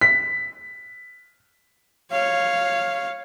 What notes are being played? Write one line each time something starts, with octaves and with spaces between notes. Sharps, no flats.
B6
C#5 F5